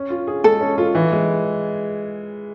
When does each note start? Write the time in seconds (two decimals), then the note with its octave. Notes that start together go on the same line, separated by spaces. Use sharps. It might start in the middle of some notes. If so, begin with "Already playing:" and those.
Already playing: C#4
0.10 F4
0.27 G#4
0.44 G#3 A4
0.61 C#4
0.78 F4
0.95 E3
1.12 G#3